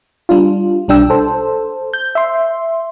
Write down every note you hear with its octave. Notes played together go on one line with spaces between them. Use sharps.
G3 D4 F4
B1 G3 D4 G5 E6
A4 C5
G6
E5 C6